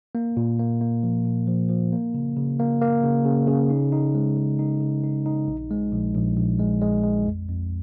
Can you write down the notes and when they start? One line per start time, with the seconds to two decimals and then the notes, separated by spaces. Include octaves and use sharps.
0.15 A#3
0.37 A#2
0.59 A#3
0.81 A#3
1.03 F3
1.25 A#2
1.47 F3
1.69 F3
1.93 A#3
2.14 C#3
2.37 C#3
2.59 A#3
2.81 A#3
3.04 C#3
3.25 C#3
3.47 C#3
3.70 D#4
3.92 D#4
4.15 G#3
4.37 C#3
4.59 D#4
4.81 C#3
5.04 D#4
5.26 D#4
5.48 A#1
5.71 G#3
5.92 A#1
6.15 A#1
6.37 A#1
6.59 G#3
6.81 G#3
7.04 G#3
7.26 F2
7.48 F2